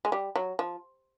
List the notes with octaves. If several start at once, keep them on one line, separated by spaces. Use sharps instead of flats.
G#3
G3
F#3
F3